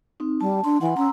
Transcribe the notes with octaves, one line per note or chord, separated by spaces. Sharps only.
C4 D#4
G3 A5
D4 C6
E3 F#5 C6
C#4 A#5 C6 E6